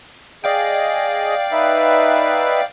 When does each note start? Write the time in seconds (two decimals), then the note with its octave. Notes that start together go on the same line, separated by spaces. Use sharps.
0.44 G#4 D5 D#5 F5 G5
1.52 D#4 B4 E5